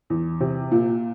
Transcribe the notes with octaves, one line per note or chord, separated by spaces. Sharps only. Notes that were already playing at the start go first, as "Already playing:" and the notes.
E2
C3
A#2